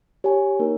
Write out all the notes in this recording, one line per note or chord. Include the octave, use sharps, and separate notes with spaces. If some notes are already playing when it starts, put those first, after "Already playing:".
G4 C#5 G#5
A#3 D#4 A#4 C#5